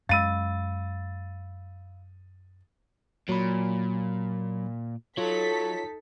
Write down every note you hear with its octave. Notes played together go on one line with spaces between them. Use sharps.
F#2 G#3 F5 B5 E6 A6 D#7
A#2 F#3 B5
F#3 D#4 F4 A4 C#5 B6